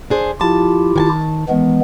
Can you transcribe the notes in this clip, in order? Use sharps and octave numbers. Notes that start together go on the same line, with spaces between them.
D4 G#4 C5
F3 E4 F4 G4 A5
D#3 G#5 A5
D#3 E3 G#3 B3